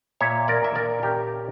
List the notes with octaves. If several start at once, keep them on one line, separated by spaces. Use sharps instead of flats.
A#2 C#5 E5
A#4 D5
A#2 E5
A#4 D5
C#4 G4 A#4